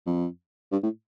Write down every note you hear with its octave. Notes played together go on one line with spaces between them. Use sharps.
F2
G2
A2